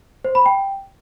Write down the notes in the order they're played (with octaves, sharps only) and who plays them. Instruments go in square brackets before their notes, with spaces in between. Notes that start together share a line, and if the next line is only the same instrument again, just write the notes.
[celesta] C5
B5
G5